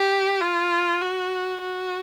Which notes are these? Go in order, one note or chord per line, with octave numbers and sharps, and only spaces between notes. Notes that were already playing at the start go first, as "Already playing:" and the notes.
Already playing: G4
F4
F#4
F#4